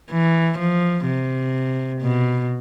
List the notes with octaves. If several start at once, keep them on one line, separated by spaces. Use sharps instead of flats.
E3
F3
C3
B2